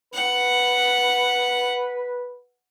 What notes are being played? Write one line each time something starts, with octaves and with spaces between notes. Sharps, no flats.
B4 F#5